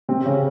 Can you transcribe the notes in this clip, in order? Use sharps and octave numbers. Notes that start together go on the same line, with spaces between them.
C3 C4
C#3 C#4